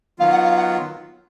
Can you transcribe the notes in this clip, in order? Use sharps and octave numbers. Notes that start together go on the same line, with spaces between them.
D#3 F#3 B3 F4 F5
F#5
F5
F#5